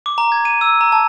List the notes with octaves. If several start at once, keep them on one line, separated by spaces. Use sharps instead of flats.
D6
A#5
G#6
D#7
E6
A#5
A5